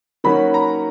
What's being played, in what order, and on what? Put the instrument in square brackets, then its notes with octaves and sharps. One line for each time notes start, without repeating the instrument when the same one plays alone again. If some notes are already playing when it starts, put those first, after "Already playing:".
[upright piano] D#3 F#3 A#3 C#4 F#4 [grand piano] B5
[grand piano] A#5